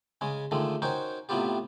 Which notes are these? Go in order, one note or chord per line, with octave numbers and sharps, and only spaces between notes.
C#3 G#3 C#4
D3 D#3 F3 G#3 A3
C#4 D#4 F#4 A#4 C5 G5
A2 C3 F#3 B3 F4 G4